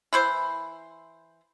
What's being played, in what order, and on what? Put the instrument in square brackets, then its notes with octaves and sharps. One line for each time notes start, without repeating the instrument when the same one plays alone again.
[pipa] E3 E4 C5